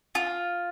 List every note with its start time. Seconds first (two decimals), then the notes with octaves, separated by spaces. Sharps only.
0.15 F4